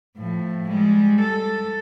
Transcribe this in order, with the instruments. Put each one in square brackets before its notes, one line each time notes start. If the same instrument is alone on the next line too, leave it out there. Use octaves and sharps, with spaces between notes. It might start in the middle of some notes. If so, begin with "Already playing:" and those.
[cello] A2 F3
G3 G#3
A4